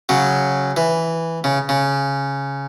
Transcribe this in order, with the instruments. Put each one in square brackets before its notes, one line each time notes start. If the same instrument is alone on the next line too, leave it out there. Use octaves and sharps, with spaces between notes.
[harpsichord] C#3 F#3
E3
C#3
C#3